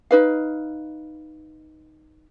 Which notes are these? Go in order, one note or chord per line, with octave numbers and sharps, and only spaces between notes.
D#4 B4 F5